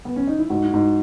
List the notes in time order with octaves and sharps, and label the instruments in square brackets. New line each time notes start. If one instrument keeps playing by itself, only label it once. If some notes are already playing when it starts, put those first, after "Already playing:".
[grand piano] B3
C#4
D#4
E4
[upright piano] G#2 [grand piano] F#4
[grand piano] E4
[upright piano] G#2 [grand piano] F#4